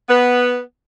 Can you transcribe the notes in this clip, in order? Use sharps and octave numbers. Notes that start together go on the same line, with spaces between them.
B3